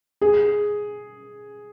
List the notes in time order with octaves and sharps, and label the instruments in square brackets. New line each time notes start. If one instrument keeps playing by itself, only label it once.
[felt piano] G#4